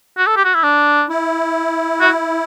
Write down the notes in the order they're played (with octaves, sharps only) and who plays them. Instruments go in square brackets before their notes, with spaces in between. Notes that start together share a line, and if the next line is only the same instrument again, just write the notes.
[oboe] F#4
A4
G4
F#4
E4
D4
[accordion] E4
[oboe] F#4